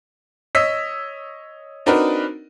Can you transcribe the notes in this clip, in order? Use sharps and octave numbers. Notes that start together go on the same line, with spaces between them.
C#5 D#5 E6 B6
C4 D4 D#4 F#4 A#4 B4